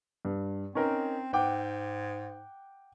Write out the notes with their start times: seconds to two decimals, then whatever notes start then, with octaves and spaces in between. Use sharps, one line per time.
0.25 G2
0.75 C4 C#4 D#4 A#4
1.33 G#2 F#5 G5 D6